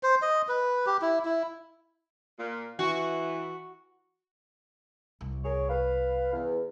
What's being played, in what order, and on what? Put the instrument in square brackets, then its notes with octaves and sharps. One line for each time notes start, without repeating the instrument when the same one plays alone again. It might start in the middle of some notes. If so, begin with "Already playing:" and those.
[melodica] C5
D#5
B4
G4
E4
E4
[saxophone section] A#2 A#3
[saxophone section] E3 [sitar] F#4
[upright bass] C2
[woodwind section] G#4 A#4 C#5
B4 F5
E2